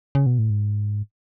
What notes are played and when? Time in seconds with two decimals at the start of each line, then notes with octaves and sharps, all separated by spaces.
0.15 C#3
0.26 B2
0.39 A2
0.50 G#2